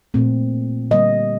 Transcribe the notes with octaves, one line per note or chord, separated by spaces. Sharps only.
A#2 A3 C4
D3 G3 A#3 D#5